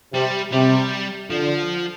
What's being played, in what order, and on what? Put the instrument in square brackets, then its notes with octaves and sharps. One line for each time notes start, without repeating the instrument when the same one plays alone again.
[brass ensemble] C3 [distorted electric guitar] G3
[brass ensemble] C3 [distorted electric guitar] G3
[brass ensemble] D3 [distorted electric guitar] F3